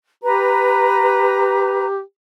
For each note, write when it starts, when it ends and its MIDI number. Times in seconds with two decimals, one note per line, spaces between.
0.24 2.01 67
0.24 1.86 71
0.24 1.86 82